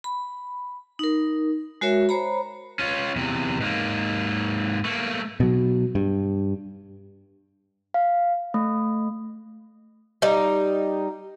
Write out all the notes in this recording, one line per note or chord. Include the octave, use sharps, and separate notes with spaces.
B5
D#4 A#4
G#3 F#4 A#4 C#5 E5
C5 C#5 A#5 B5
C#4 F4
E2 C3
G#2 A#3
A3 A#3
B2 F#3
G2
F5
A3
G3 D#4